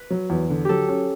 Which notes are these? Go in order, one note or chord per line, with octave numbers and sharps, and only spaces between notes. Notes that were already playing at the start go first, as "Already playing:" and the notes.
Already playing: B4
F#3
E2
D3
F#3 G4 A4
C#4